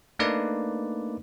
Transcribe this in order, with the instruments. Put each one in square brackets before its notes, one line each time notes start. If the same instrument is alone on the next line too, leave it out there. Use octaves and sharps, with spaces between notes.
[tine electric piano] A3 A#3 D4 D#4 B4 D5